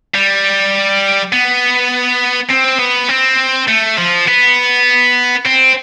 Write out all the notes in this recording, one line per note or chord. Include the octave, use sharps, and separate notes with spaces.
G3
B3
C4
B3
C4
A3
F3
B3
C4